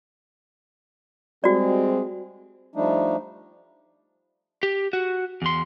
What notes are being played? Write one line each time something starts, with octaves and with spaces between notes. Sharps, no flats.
G3 G#3 C4 F#4 D5
F3 G3 A3 D4 D#4
G4
F#4
E2 C6